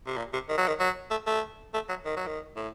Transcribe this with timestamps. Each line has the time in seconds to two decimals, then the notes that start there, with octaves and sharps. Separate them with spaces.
0.07 C3
0.17 A#2
0.33 C3
0.49 D#3
0.58 F#3
0.67 D#3
0.80 F#3
1.10 A3
1.26 A3
1.74 A3
1.89 F#3
2.05 D#3
2.17 F#3
2.26 D#3
2.56 A2